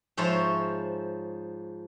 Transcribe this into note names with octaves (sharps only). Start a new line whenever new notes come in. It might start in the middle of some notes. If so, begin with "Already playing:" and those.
G#2 F3 C5 C#5 E5